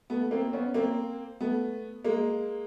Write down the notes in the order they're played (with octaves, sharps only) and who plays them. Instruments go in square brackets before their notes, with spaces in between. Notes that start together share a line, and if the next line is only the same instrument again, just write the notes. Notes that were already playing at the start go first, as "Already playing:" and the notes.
[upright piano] A3 B3
A#3 C4
B3 C#4
A#3 C4
A3 B3
G#3 A#3